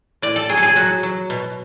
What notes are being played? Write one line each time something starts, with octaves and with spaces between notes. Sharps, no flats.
A2 D5
A4
F#3 G#4
A4
G#4
F#3 F#4
F#3
B2